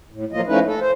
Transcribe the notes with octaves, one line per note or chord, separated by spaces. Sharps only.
A2
F3 F#3 A#3 F4 D#5
F3 A3 C#4 D#4 E4 B4
A4
C5